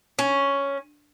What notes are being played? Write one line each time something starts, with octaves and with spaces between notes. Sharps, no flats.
C#4